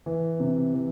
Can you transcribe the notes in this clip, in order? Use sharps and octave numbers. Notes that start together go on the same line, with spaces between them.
E3
C3
E3